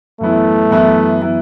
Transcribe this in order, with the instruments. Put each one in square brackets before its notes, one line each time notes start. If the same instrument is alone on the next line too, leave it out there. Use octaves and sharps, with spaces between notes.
[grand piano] F#2 E3 B3 E4 [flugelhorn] A3
[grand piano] F#2 E3 B3 E4
E3 B3 E4